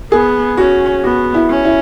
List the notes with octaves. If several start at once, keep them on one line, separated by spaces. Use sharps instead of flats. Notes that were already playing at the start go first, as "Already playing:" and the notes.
B3 G#4
C#4 F#4
B3 F#4
E4
C#4
E4